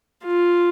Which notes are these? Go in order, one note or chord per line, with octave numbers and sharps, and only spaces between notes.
F4